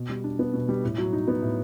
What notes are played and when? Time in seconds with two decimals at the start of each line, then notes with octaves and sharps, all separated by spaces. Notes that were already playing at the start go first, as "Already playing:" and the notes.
Already playing: B2
0.10 G3
0.24 D4
0.39 B3
0.54 B2
0.69 G3
0.84 A2
0.98 F#3
1.13 D#4
1.28 B3
1.42 A2